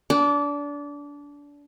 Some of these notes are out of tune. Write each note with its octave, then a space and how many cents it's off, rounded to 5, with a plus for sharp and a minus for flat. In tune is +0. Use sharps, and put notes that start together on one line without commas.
D4 -25 D6 +0